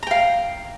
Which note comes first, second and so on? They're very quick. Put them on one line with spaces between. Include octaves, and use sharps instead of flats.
A#5 G5 F5